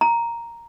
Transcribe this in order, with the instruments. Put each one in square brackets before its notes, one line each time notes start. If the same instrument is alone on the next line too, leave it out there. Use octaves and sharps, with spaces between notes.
[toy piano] A#5